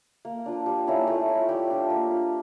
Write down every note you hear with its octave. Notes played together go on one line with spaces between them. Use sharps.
A#3
D4 F4
G3
A#3 C#4 E4
A3 F4
C#4 E4
G3 G4
D4 F4
A#3
D4 F4